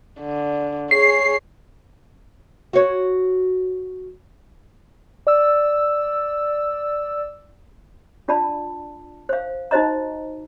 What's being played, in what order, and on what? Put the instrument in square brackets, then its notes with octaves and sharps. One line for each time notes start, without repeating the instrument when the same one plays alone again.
[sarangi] D3
[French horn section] G#4 [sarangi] C#5 [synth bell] C7
[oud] F#4 C#5
[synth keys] D5 E6
[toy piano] D4 F4 D5 A5 B5
C5 F5
D#4 F#4 C5 D#5 A#5